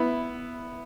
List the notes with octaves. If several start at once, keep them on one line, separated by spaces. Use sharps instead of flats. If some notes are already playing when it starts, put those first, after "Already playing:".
Already playing: B3 E4